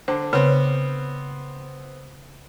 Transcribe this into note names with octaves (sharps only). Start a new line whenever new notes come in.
D3 C5
C#3 B3 C4